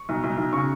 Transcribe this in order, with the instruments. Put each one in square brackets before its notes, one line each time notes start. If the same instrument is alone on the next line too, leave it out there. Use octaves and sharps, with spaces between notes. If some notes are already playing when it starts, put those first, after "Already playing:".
Already playing: [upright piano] C#6
B1
B1
B1
C#3 C#6